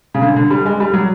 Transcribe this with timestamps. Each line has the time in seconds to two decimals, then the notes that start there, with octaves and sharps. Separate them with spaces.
0.14 C#3
0.22 D3
0.36 D3
0.51 G3
0.66 G#3
0.80 G3
0.93 F#3